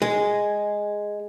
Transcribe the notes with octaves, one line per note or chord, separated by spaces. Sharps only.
G#3